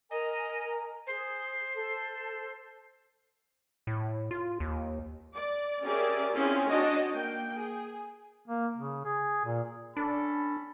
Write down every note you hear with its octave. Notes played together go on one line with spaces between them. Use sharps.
A#4 D#5 G#5 A#5
G#4 C5
A4 A5
A2
F4
D#2
D5
C#4 G4 G#4 A#4 D5 E5
C4 C#4 E4 F4 G#4
D4 D#4 F#4 C#5 D#5
A#3 G5
G#4
A#3
C#3
G#4
A#2
C#4 D4 A4 B5